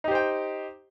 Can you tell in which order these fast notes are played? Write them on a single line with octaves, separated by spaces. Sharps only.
D#4 G4 C5 G5